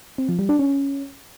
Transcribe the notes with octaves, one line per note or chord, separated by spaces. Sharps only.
C4
F3
G3
D4
C#4